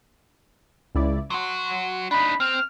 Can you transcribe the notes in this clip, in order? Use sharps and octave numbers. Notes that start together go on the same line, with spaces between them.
C#2 E4 D5
F#3 F#4 C6
D4 D#4 B5
C4 F6